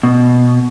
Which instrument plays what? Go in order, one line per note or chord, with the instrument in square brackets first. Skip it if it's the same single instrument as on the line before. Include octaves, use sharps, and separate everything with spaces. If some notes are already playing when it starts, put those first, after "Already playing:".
[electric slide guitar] B2